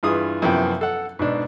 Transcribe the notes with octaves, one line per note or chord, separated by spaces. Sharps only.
G2 E3 F4 G#4 D#6
F#2 C3 E3 F3 B3 G5
A4 F#5
G#2 B2 D4